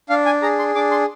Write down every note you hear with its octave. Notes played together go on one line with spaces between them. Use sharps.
D4 F5
G#5
G#4 A#5
C6
D4 D6
C6